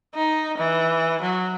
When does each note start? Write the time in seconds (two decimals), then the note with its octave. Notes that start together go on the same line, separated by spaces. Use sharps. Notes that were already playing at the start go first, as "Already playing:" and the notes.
0.15 D#4
0.58 E3
1.22 F#3